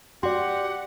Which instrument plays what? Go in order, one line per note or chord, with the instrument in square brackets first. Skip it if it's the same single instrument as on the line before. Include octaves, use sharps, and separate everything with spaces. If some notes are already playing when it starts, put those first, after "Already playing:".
[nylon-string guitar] F#4 [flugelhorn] G4 [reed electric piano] D5 C6 [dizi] F#5